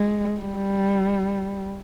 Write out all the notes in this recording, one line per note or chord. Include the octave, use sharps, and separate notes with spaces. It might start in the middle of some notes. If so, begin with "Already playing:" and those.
Already playing: G#3
G3